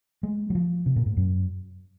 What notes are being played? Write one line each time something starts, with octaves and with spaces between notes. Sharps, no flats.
G#3
F#3
F3
C3
A#2
G#2
F#2